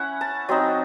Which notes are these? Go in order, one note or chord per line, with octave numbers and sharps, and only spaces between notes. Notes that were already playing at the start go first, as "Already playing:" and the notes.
Already playing: C#4 E4 E5 F#5
A5
F#3 C4 D#4